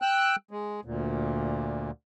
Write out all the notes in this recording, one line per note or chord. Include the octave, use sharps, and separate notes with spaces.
G5 E6 F#6
G#3
D2 A#2